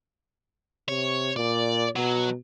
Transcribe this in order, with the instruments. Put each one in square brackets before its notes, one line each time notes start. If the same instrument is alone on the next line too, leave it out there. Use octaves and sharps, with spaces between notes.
[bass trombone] C3 [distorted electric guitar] C#5
[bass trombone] A#2 [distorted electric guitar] D5
[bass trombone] B2 [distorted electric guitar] F#3